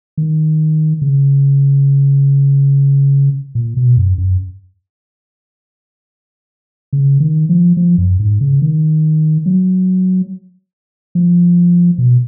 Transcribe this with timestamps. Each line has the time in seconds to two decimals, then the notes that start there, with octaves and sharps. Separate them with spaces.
0.18 D#3
1.02 C#3
3.55 A#2
3.77 B2
3.97 F#2
4.18 F#2
6.93 C#3
7.20 D#3
7.49 F3
7.77 F3
7.98 F#2
8.20 G#2
8.41 C#3
8.62 D#3
9.46 F#3
11.15 F3
11.98 B2